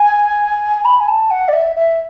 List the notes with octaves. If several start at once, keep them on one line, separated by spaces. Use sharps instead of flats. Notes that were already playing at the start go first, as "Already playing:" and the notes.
Already playing: G#5
B5
G#5
A5
F#5
D5
E5
E5